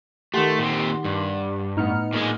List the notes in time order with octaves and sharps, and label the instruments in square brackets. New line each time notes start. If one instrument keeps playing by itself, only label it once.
[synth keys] D#3 C6 [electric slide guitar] A3 [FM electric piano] G4 F#5
[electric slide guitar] A#2 C4
G2
[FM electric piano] A2 F6 C#7 [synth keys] B3 D#4
[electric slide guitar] A#2 G#3 G#4